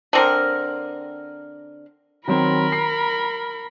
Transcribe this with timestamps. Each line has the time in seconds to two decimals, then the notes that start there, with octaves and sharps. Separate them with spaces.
0.13 D3 C4 A#4
2.28 D#3 F#3 C4 A#4 B5
2.72 C7